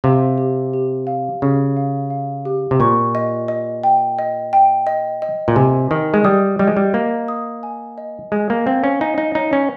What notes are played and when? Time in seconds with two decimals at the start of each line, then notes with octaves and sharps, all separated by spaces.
0.04 C3 F5
0.38 G4
0.73 G4
1.07 F5
1.42 C#3 G4
1.77 F5
2.10 F5
2.45 G4
2.71 C3
2.80 A#2 C#6
3.15 D#5
3.48 D#5
3.84 G5
4.19 D#5
4.53 G5
4.87 D#5
5.22 D#5
5.48 A#2
5.56 C3 G#5
5.91 D#3 D#5
6.14 G#3
6.24 G3 D#6
6.59 G3 D#5
6.67 G#3
6.77 G3
6.94 A#3 D#5
7.28 D#6
7.63 G#5
7.98 D#5
8.32 G#3 G#5
8.50 A#3
8.67 C4 F5
8.84 C#4
9.01 D#4 G#5
9.18 D#4
9.35 D#4 C#5
9.53 C#4